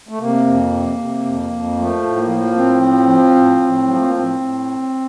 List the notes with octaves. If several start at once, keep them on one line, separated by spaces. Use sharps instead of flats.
A3
C3 A#3
F2
C3
C3
F2
F2
F3 A3
A2
A#3
F3
A2 C4
F3
F3
A2
A2
F3 F#3
A3
A#3
A2 C4
A2